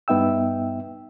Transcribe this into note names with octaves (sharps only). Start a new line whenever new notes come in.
G2 B3 D#4 E5 G5 E6